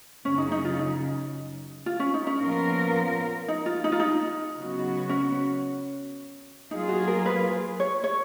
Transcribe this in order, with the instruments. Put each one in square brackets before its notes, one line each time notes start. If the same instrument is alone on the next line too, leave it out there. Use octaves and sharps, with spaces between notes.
[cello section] F#2 C#3 F#3 [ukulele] C#4
[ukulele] D#4
D#4
F4
D#4
F4
C#4
D#4
C#4
[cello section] A#2 F3 B3 F4 A#4
[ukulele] D#4
F4
D#4
F4
D#4
[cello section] C#3 F#3 B3 F#4
[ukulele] C#4
[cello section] F#3 A#3 F4 G#4 [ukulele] D#4
[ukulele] F#4
A#4
B4
C#5
C#5